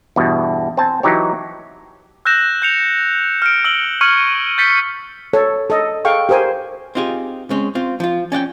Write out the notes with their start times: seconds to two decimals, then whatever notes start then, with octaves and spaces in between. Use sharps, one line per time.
0.16 E2 G2 B2
0.77 C4 G#5 A5
1.03 E3 F#3 D#4 G4 C#5
2.25 E6 F#6 G6 A#6 E7
2.62 G6 C#7 F7
3.42 F6 D7
3.65 E6 F6 C#7 D7 F#7 G7
4.01 C#6 F6 G#6 C#7 D#7 F#7
4.58 G6 A6 B6 C#7 G7
5.33 A4 C#5
5.70 A4 D#5
6.05 G#4 A4 F5 G5 C#6
6.29 G4 A#4 C5 G#5
6.95 C4 D#4 F4 G4 G#4
7.50 G#3 C4 C#4
7.75 C4 F4
8.00 F3 F4
8.32 C#4 D5 F#5 G5